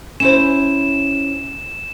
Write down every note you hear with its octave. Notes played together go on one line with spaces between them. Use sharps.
C#4 E4 C5 E7